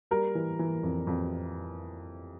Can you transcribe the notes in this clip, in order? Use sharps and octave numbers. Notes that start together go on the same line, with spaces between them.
G3 A#4
E3
E3
F2
F2